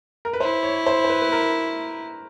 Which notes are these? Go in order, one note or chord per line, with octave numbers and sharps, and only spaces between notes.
A#4
B4
E4 C5
C#5
C5
C5
B4
B4
A#4